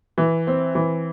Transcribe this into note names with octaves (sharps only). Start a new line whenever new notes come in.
E3
C4
E3